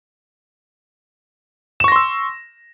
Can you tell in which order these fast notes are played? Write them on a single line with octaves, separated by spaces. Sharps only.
E7 C#6 A#6 C6 E6